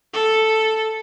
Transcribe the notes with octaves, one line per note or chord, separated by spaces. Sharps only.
A4